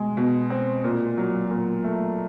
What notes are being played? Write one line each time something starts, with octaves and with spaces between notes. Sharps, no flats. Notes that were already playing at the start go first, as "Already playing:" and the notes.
Already playing: B2 G#3
B2
C4
A#2
F#3
A#2
A3